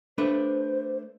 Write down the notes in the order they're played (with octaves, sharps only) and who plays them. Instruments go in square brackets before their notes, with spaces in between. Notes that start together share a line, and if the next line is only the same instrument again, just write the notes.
[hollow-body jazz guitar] A3 D4 B4 [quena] C5